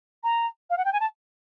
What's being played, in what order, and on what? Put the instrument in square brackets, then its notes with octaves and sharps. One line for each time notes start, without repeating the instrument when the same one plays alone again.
[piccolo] A#5
F5
F#5
G5
G#5
A5